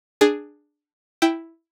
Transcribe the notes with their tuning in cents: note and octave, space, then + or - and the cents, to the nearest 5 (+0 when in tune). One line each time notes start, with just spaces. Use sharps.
D4 +10 G#4 +0
E4 +0 G5 +0